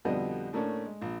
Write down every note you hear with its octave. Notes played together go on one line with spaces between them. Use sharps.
F2 B2 D3 G3 B3 D#5
A2 A3 A#3 C#4 D4
G#3
A#1